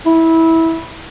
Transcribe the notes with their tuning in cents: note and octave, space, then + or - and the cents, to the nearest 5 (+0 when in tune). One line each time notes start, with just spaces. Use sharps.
E4 -15